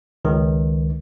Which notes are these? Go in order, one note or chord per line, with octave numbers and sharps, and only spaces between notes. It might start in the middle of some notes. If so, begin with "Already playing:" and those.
C#2 D#3